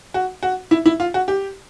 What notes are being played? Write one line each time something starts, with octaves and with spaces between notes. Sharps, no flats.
F#4
F#4
E4
E4
F4
F#4
G4